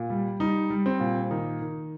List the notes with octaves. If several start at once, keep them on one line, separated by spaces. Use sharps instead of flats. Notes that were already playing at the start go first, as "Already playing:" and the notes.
Already playing: A#2
G3
G3 D#4
G3
C4
A#2
D#3 D#4
D#3